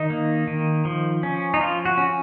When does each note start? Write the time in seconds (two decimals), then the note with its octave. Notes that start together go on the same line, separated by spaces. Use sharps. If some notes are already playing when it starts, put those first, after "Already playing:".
Already playing: D#3 D#4
0.10 A#3
0.47 D#3
0.85 F3
1.23 C#4
1.54 D#4
1.60 F3 F4
1.85 F#4
1.98 C#4